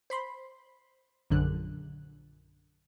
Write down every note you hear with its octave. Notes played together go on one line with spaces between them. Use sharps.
C5 B5 C6
A#1 F#2 D3 F#6